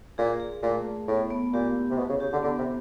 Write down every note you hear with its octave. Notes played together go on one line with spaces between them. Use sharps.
A#2 G#4
G#4
A#2 A3
A3
A2 B3
B3
A#2 G4
E4
C3
B2 G4
C#3
C#3 G4
D3
D3 B3
C3